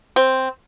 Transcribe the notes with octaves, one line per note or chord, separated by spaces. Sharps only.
C4